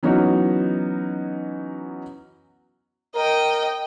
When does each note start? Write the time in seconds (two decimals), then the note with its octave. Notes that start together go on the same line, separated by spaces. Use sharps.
0.03 E3 F#3 B3 C#4 D#4 F#4
3.15 A#4 D#5 G5